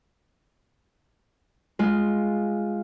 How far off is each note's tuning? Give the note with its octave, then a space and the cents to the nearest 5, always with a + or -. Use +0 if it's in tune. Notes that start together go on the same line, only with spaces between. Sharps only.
G#3 +0 F4 +0